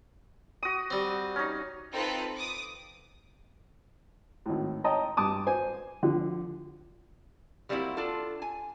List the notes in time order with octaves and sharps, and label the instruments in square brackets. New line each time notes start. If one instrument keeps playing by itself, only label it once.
[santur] F#4 D#6
[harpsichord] G3 C4
[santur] C#4 D#4
[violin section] C4 D#4 F4 A4 B4
D6 D#6
[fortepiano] G#1 A2
C#5 D#5 G5 A5 A#5 D#6
G2 A5 D6 D#6
C5 G#5
D3 F3
[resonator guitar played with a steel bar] F#3 G3 A#3 C4 D#4 E4
D4 F4 A4
G#5